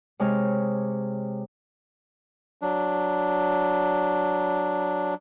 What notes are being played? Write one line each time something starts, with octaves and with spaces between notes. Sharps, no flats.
C3 G#3 C#5 F6
F#3 D4